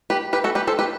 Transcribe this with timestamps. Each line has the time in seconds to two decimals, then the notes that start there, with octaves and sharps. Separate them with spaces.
0.10 G4 B4
0.33 G4 B4
0.44 F#4 A4
0.55 G4 B4
0.67 A4 C5
0.79 G4 B4